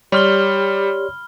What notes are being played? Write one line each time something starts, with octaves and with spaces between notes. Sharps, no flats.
G3 G4 C#5 D5 B5 C6 F6 G7